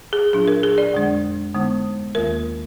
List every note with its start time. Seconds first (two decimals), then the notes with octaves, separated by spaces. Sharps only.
0.13 G#4
0.33 A#2 F#3 D4 F4 G#4
0.48 A#4
0.63 G#4
0.78 D5
0.93 F2 D3 G#3 D4
1.54 D3 G#3 B3 D#4
2.15 D#2 D#3 A#3 F4 A#4